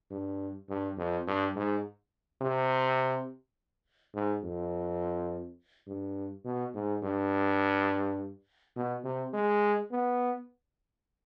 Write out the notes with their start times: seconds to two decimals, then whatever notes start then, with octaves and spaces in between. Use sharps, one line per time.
0.11 G2
0.69 G2
0.98 F2
1.27 G2
1.56 G#2
2.41 C3
4.15 G#2
4.43 F2
5.87 G2
6.45 B2
6.74 G#2
7.03 G2
8.76 B2
9.04 C3
9.33 G#3
9.92 B3